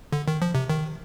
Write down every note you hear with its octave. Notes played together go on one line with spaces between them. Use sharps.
D3
D#3
F3
C3
D#3